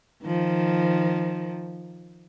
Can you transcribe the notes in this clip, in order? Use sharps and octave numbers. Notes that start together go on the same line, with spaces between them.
D#3 F3